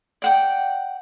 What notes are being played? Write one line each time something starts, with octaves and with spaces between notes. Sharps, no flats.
D5 F#5 G5